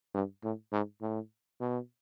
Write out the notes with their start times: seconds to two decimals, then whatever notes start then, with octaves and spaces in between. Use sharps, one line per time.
0.14 G2
0.43 A2
0.72 G#2
1.01 A2
1.61 B2